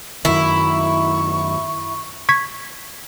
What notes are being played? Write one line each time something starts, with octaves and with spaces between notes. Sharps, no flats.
F#2 D#3 E4 C#6
C#6 G#6 B6